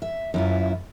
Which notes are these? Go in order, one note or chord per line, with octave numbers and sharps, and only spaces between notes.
E5
F#2 E4 F4